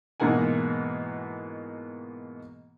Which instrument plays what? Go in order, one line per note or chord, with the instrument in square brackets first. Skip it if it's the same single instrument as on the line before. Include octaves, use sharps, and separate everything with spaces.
[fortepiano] G#2 B2 E3 A#3 F#5 G#5